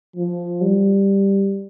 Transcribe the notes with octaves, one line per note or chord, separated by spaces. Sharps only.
F3
G3